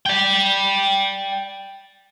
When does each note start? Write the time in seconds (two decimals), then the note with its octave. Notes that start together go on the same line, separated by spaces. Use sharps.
0.06 D5 G5